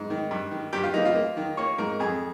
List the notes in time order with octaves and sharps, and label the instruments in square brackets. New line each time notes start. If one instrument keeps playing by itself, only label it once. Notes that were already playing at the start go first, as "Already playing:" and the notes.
Already playing: [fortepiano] G#2
D#3
G2
D#3
G2 G4
F4
A#3 D#4
F4
A#3
D#3
A#3 C#5
G#2 A#4
F2 G#4